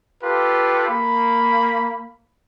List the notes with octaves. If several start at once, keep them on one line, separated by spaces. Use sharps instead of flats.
F4 G4 A4 B4
A#3 B5